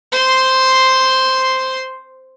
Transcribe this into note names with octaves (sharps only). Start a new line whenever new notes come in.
C5 C6